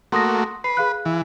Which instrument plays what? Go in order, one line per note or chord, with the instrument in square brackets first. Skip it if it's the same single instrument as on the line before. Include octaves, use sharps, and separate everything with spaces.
[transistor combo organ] A3 A#3 F#4 [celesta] C6 D#6 A#6
[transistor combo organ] B4 [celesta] C7
[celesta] G#4 F5 F#6
[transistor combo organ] E3